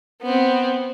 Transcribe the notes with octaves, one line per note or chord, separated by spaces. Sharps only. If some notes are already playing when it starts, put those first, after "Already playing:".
B3 C4